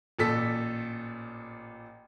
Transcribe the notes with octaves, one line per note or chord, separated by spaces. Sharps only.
A1 A#2 A4 B6